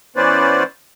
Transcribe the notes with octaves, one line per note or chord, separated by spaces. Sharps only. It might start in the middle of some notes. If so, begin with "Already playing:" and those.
E3 B3 C#4 B4 C5 D5